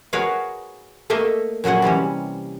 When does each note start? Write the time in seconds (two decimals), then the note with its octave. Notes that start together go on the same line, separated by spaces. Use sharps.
0.13 F#4 G#4 A#4 B4 C#5 F5
1.10 A3 A#3 A4 D#5 E5
1.64 A#2 F#3 F#4 G#4 F#5
1.82 C3 E3 G3 C#4